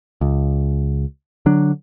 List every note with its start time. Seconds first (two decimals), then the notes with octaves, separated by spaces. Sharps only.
0.21 C#2
1.46 D3 F#3 D4